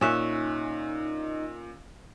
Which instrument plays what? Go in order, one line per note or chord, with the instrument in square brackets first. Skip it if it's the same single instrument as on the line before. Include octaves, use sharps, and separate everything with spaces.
[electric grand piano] A#2 F#6 [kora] C#4 E5 [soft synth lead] D#4